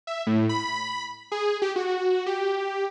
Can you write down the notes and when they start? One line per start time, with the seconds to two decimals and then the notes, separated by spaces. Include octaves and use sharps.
0.07 E5
0.27 A2
0.49 B5
1.32 G#4
1.62 G4
1.76 F#4
2.26 G4